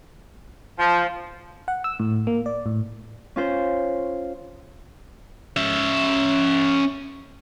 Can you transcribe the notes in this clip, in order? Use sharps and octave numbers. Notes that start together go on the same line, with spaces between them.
F3
F#5
E6
A2
A#3
D5
A2
C#4 F4 C5
C#4 E5